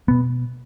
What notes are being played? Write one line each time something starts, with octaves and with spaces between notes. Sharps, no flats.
B2 B3